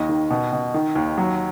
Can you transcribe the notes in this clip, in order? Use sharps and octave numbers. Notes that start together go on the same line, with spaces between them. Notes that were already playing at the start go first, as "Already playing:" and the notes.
Already playing: D#2 D#5
D#3
B2
B2
D#3
D#2
F#3